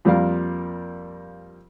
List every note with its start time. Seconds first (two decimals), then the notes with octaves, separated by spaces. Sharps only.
0.05 F2 G3 A#3 A#4 F5